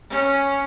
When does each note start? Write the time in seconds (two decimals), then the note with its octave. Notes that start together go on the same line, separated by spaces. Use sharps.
0.10 C#4